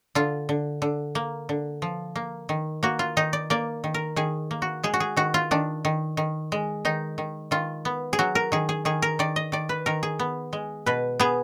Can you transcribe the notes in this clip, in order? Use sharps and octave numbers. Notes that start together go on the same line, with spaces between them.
D3 F4
D3
D3
A#3
D3
F3
A#3
D#3
A#3 F#4
F4
D#3 D#4
D5
A#3 D5
D#3
A#4
D#3 G#4
A#3
F#4
G#3 G#4
F#4
G#4
D#3 F#4
F4
D#3 D4
D#3
D#3
G#3
D#3 D#4
D#3
D#3 F4
B3
G#4
F#3 F#4
A#4
D#3 G#4
G#4
D#3 G#4
A#4
D#3 D5
D#5
D#3 D5
B4
D#3 A#4
G#4
B3
G#3
B2 B4
B3 G#4